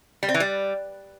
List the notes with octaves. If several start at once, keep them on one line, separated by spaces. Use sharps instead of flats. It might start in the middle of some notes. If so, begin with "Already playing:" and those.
G3
C4
E3
G3